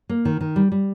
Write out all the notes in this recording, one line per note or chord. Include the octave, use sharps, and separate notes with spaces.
A#3
D#3
D#3
G3
G3